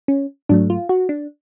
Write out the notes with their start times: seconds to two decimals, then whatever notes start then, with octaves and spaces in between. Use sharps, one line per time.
0.08 C#4
0.49 G#2 F#3 A3 D4
0.70 F4
0.89 F#4
1.09 D4